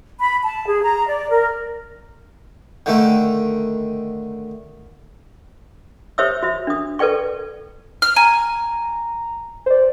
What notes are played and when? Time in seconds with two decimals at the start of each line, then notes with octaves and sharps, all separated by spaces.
0.20 B5
0.43 A5
0.67 G#4
0.82 A#5
1.07 D5
1.30 A#4
2.86 D3 D#3 A3
6.18 G4 C5 C#5 E5 D#6 E6
6.43 F#4 C5 E5
6.67 D4 D#6
6.99 A4 B4 D5 G5 C#6
8.02 F6
8.16 G#5 A#5
9.66 C5 D5